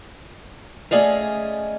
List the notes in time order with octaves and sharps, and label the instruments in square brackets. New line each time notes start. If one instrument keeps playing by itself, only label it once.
[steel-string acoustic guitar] A3 C#4 G#4 D5 D#5 F5